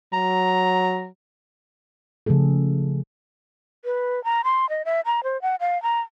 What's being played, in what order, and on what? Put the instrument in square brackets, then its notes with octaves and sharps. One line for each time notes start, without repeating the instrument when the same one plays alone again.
[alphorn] F#3 [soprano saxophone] A#5
[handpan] C#3 F3 A3 G#4 A4
[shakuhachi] B4
A#5
C6
D#5
E5
A#5
C5
F#5
F5
A#5